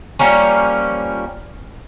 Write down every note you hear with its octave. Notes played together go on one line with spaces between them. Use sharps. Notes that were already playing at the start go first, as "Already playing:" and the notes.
F3 G3 A#3 C#4